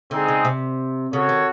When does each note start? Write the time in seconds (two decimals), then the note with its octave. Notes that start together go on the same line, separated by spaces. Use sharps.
0.11 D3 G#3 C4 D#4 G#4
0.28 C#3
0.45 C3
1.13 C#3 F#4 A4 C#5
1.29 D#3